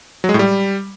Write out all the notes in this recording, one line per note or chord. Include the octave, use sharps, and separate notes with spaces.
F#3
G#3
A2
G3